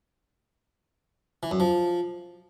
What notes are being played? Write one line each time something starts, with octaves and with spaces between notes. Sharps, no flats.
E3
F#2
F3